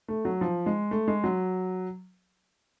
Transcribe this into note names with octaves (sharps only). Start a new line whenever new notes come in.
A3
F#3
F3
G#3
A3
G#3
F#3